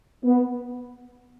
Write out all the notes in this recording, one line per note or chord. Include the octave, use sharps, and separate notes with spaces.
B3